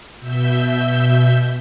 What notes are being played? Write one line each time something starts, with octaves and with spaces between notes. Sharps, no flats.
B2 E5 G6